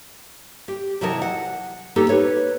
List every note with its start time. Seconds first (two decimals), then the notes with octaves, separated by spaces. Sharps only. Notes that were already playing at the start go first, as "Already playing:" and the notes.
0.68 G4
1.01 C3 E3 F#3 A#4 D#5 A5
1.22 F#5
1.96 A#3 B3 D#4 G4 A4
2.09 B4 C#5